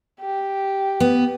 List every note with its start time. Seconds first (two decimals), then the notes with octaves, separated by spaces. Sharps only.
0.21 G4
1.00 B3